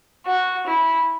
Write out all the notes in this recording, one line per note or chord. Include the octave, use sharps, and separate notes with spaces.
F#4
E4